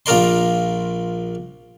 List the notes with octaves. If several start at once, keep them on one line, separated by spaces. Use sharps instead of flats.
A#1 F4 A#4 D5 C6